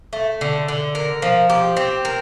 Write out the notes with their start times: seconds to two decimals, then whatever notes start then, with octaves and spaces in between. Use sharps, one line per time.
0.13 A3
0.41 D3
0.68 D3
0.95 A#4
1.22 F3
1.50 G4
1.77 C4
2.05 A#4